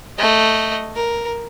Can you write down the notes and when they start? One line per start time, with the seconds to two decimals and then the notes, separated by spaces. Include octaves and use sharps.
0.18 A3 D#5
0.95 A#4